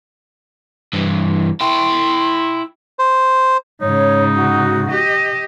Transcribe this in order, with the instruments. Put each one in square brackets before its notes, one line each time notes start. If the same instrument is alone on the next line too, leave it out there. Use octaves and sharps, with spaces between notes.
[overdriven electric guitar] G2 E3
[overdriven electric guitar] E4 G5 [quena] C6
[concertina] C5
[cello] G#2 C#3 [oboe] D#4 [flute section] C#5
[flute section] F#4
[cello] G4 D#5